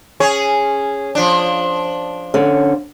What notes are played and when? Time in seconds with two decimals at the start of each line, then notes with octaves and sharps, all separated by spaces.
0.20 C#4 G#4 C#5
1.15 F3 D4
2.34 D3 C#4